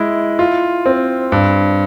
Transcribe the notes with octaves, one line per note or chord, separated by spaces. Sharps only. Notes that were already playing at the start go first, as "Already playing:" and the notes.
Already playing: G#3 E4
F4
C4
G2